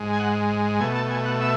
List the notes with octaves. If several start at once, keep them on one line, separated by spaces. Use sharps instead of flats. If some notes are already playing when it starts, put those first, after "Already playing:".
Already playing: G#2 G#3
G#5
F#5
B2 A3 G#5
A5
G#5
F#5
E5